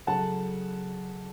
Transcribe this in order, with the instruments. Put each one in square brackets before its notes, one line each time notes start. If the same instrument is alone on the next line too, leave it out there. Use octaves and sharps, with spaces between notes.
[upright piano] C#3 F#3 A3 F#5 A5